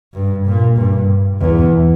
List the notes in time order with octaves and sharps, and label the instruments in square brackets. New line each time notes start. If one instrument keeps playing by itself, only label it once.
[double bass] G2
A#2
G2
E2